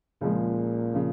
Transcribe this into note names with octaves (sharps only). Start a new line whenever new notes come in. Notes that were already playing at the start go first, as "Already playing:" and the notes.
C#2 A#2 C#3 F3 G#3
C#3 F3